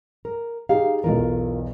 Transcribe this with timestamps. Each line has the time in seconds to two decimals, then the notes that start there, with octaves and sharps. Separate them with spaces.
0.25 A#4
0.69 D#4 G4 G#4 F5
1.04 B1 E2 F4 A#4